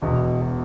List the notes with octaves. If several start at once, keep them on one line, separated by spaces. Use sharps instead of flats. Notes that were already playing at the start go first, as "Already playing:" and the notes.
E1 E2 B2
B2